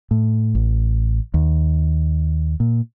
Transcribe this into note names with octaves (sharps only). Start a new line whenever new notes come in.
A2
A1
D#2
A#2